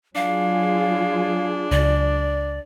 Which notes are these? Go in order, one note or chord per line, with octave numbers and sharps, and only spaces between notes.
F#3 D4 F4 G#4 F5
C#2 D5